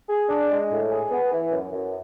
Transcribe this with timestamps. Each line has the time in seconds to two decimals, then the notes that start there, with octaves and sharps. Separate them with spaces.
0.09 G#4
0.30 D4
0.51 G#3
0.71 A2
0.92 G#4
1.11 B3
1.32 E3
1.52 F#2
1.72 F#2